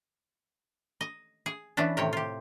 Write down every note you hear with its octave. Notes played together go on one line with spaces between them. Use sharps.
D#5
G#4
E3 B3 C#4 D4
A2 C3 D#3 C#5 G5
F4 G4